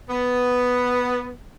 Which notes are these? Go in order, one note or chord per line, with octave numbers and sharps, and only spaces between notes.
B3